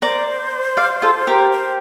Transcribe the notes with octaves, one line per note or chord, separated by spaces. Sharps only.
A#4 C5 D5
D5 F5
F4 A4
G4 A#4
C5